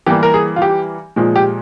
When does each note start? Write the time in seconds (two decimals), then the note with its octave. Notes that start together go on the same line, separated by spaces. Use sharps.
0.06 E3 G3 A#3 G4
0.23 A#4
0.34 G#4
0.56 F4
0.62 G4
1.16 A#2 F3 G#3
1.36 G4